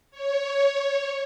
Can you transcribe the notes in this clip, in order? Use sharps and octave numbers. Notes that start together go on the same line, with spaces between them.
C#5